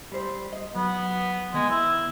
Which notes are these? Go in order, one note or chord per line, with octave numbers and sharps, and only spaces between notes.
G3 C5
D#5
F#3 B3
D#3 G#3 B3
E4